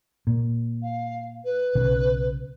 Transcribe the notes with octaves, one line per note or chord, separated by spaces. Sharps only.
A#2
F5
B4
B1 C#3